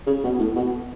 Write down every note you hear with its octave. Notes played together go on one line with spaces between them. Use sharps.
C#3
B2
A2
B2